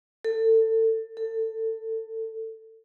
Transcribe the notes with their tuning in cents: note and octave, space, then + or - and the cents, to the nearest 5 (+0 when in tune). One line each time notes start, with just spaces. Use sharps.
A4 +25
A4 +20